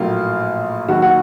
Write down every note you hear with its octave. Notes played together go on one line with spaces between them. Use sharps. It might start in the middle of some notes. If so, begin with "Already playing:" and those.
Already playing: A#1 A2 F#3 A#3 F4
D#2 D#3 F#3 F#4
F#4